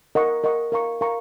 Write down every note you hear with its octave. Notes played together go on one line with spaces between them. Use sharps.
A#4 D#5 F#5 C#6
A#4 D#5 F#5 C#6
A#4 F5 A#5 C#6
A#4 F5 A#5 C#6